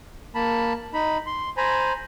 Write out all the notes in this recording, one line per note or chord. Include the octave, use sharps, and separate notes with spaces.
A#3 A5 B5
D#4 B5
C6
C5 G#5 A#5 B5